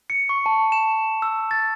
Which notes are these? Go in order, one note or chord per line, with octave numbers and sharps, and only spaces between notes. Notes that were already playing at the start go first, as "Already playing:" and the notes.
C#7
C#6
A5
E7
E6
A6